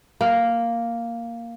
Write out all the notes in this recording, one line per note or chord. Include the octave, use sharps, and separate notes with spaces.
A#3